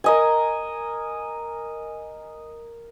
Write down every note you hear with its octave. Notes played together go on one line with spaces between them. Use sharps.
A#4 D#5 G#5